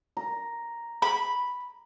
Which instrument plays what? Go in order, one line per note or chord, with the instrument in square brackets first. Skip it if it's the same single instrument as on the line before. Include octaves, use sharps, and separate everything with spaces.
[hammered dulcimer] A#5
[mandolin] B5